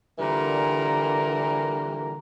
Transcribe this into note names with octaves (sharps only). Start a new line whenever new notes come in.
A#2 D3 E3 G3 A#4